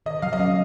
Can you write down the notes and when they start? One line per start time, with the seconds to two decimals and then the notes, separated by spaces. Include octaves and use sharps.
0.06 D#3 D#5
0.22 F#3 F5
0.33 D#5
0.39 C#4 F5